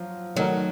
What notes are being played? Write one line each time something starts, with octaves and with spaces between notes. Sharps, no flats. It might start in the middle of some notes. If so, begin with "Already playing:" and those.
Already playing: F3 F#3
D#3 F#3 A3 D#4 F#4 A#4